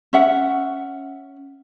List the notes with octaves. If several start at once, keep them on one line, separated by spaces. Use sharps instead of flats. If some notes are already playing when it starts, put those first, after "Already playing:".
C#4 E5 F#5